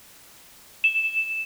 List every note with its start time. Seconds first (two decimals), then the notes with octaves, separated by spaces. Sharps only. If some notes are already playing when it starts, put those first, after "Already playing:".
0.84 E7